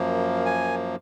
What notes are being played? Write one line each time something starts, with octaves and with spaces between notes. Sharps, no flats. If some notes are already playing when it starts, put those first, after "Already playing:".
Already playing: F#2 F3 A#3
G#5